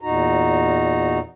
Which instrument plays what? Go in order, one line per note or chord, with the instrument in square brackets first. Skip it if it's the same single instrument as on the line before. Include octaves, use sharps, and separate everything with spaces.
[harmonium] E2 A#2 D#4 F#4 A#5